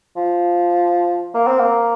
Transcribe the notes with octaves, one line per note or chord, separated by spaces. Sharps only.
F3
A#3
C4
A#3